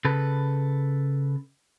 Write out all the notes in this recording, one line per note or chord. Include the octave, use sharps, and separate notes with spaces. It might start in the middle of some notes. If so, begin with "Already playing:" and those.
C#3 A4 B4